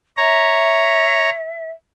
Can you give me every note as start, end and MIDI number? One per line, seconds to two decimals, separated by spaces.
0.17 1.30 73
0.17 1.70 76
0.17 1.30 82